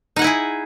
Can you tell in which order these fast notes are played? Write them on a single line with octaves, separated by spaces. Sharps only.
D#4 F#5 G#5 E4 G#4